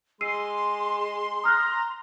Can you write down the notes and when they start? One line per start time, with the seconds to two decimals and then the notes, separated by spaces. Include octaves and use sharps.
0.21 G#3 C6 E6 C7 D#7
1.44 A#5 D#6 F6 F#6